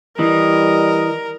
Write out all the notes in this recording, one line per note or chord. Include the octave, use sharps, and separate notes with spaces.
E3 G3 A#4 D#5